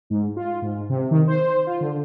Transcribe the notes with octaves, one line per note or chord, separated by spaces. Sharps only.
G#2
F4
G#2
C3
D#3
C5
F4
D3